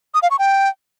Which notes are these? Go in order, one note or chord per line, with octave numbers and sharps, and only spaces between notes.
D#6
F5
C#6
G5